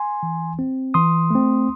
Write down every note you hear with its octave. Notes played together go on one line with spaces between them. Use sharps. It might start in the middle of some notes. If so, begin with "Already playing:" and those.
Already playing: G#5 C6
E3
C4
E3 C6 D#6
A3 C4